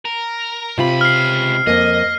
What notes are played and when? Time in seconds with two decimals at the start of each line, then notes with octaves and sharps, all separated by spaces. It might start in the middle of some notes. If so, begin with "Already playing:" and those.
0.05 A#4
0.78 C#2 C3 F4 B5
1.01 F6 C7
1.67 F2 A#3 D#5